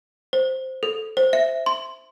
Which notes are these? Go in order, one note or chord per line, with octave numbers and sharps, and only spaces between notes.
C5
A4
C5
E5
C6